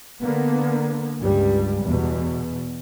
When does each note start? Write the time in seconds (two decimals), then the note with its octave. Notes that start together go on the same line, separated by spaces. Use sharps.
0.22 D3 A#3 B3
1.20 C#2 G2 G3
1.83 E2 B2